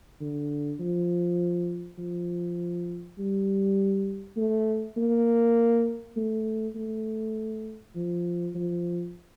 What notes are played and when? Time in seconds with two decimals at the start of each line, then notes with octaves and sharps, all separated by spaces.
0.21 D3
0.80 F3
1.98 F3
3.19 G3
4.37 A3
4.97 A#3
6.17 A3
6.76 A3
7.96 F3
8.55 F3